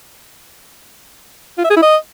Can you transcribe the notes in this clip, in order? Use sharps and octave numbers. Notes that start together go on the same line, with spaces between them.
F4
E5
G#4
E4
D#5